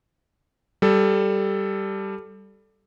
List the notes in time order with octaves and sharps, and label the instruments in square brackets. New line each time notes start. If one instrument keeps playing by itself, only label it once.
[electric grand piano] G3 A4